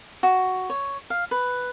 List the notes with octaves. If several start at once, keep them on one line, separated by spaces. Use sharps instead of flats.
F#4
C#5
F5
B4